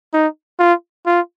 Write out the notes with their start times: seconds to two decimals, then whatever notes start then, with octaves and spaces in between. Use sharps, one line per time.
0.14 D#4
0.59 F4
1.06 F4